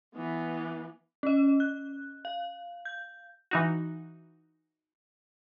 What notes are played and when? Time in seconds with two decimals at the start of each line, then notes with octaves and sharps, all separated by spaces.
0.15 E3 B3
1.23 C#4 D#5
1.60 F#6
2.25 F5
2.85 G6
3.51 E3 D#4 F#4